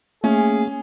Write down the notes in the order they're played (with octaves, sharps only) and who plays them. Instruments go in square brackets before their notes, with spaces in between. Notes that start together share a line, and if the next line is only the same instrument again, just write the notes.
[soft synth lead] A3 [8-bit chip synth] A#3 [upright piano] C#4 [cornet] G#4